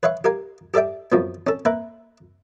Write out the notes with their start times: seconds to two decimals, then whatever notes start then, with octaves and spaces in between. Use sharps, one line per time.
0.03 B4 C#5 E5 F5 C#6
0.24 G4 A#4 F5 G#5
0.74 G4 A4 D5 E5 G5
1.12 F#2 F3 B3
1.47 C#4 A4
1.65 A#3 B4 E5